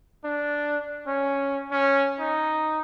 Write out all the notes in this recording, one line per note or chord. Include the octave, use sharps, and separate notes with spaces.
D4
C#4
C#4
D#4